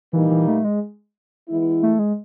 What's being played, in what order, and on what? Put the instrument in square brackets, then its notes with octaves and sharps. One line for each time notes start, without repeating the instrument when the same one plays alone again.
[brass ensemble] A#2 G3 A#3 D#4 [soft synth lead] E3
[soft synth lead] E3
A3
G#3
[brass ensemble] E3 G#3 B3 E4
[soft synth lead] A3
G#3